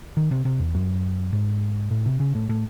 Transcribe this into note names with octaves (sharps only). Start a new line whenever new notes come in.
D#3
C3
C3
E2
F#2
G#2
A2
C3
C#3
A2
A2